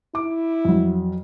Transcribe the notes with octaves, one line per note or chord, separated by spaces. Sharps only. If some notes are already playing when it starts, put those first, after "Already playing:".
E4 D6
F2 F#3